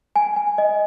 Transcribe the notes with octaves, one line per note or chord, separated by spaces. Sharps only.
G#5
G#5
D#5